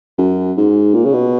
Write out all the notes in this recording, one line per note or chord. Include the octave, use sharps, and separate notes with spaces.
F#2
G#2
A#2
C#3
B2